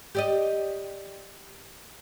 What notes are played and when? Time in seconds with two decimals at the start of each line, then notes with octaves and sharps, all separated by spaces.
0.15 G4 D5 D#5